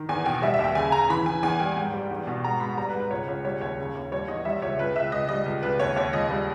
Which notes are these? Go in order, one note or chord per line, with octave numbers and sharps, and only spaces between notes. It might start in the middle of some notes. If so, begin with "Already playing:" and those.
Already playing: D#3
E2 G#5
B2 G5
G3 E5
E5
D#2
G5
C#3 G#5
C#3 A#5
E3 B5
E3 G#5
E2 G#5
G3 G5
G#2 G5
G3
E2
B2
G#2 A#5
G#2 B5
G3 A#5
B4
G#2
B4
C#2 C#5
C#2 C#5
G3 C#5
D#2 C#5
C#3
D#2
G3 C#5
E2 D#5
G3 E5
C#2 C#5
C#2 B4
C#2 E5
C#2 D#5
G3 D#5
C#2
C#2 B4
D#2 C#5
D#2 C#5
C#2 D#5
G3